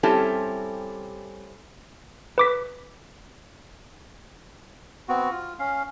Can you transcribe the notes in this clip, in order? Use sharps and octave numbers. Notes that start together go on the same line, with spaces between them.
G3 C4 C#4 E4 G4 A4
B4 D6 B6
B3 C4 F#4
F4
C#4 F5